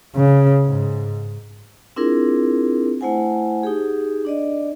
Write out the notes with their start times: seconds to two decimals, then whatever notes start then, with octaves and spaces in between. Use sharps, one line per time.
0.16 C#3
0.66 G#2
1.96 C4 D4 E4 F4 G#4 A#4
3.01 A3 E4 C5 F#5 G#5
3.63 D#4 G4 G#4
4.25 D4 D5 D#5